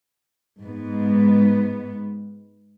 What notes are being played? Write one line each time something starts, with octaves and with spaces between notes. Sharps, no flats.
G#2 B3